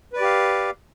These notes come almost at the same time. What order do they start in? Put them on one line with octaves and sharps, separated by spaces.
B4 D5 G4 F5